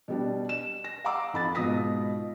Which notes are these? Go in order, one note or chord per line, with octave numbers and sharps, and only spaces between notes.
B2 G3 D4
E7
A#6
F5 F#5 A#5 D6 E6
F2 B5 A6
G#2 B2 F4 D#6 A#6 B6